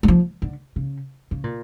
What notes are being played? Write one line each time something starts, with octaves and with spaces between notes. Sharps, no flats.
G3
F3
D3
C#3
C#3
A#2